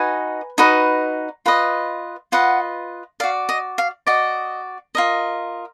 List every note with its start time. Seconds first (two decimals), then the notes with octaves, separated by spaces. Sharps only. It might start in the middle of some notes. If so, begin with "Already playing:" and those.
Already playing: D#4 F#4 B4 D#5 G#5
0.58 D#4 F#4 B4 D#5
1.46 F4 B4 D#5
2.32 F4 B4 D#5 F#5
3.20 F#4 D5 F5
3.49 D#5
3.78 F5
4.07 F#4 D5 D#5
4.95 F4 A#4 D#5